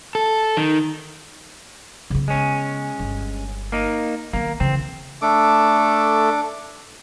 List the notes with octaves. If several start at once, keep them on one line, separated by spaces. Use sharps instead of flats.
A4
D#3
C#3 B3
G#3 C#4
G1
A#3 D#4
D#3 A#3 B3
C#3 E3 C4
A3 D4 A4 D6